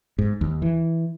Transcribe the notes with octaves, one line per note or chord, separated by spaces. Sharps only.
G#2
D#2
E3